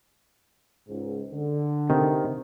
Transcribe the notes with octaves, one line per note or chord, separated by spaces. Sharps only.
C#2 G#2
D3
C3 D#3